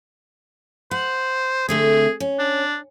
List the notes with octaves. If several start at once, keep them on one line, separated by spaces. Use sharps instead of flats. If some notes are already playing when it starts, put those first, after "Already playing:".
C5 F#5
D3 A3 C4 G#4
C#4
D4